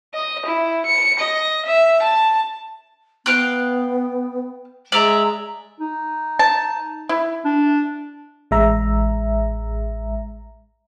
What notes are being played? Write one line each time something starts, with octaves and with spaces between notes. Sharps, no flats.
D#5
E4
C#7
D#5
E5
A5
B3 F5 G5 F#6
G#3 D5 E5 A#5
D#4
A5
E4
D4
A1 G#3 E5 A#5